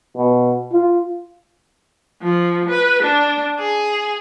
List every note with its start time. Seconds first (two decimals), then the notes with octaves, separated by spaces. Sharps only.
0.17 B2
0.72 F4
2.20 F3
2.69 B4
3.02 D4
3.58 G#4